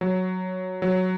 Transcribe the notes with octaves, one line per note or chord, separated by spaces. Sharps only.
F#3
F#3